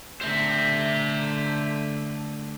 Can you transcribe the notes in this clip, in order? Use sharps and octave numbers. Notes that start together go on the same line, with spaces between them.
D3 A3 C5 E5